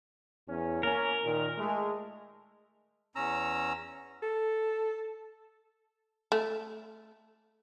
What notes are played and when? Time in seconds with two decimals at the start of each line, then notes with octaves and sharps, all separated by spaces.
0.48 E2 C#4
0.83 A#3 C#4 A#4
1.25 A#2 D#3
1.58 G#3 A3
3.16 E2 C#4 A#5 E6
4.23 A4
6.32 A3